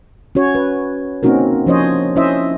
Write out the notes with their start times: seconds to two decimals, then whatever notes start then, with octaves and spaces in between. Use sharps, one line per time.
0.35 C#4 F#4 C#5
0.55 B4
1.23 A#3 C4 C#4 D#4 F#4 A#4
1.67 F3 C#4 D4 C5 C#5 D#5
2.16 C#4 E4 C5 D#5 E5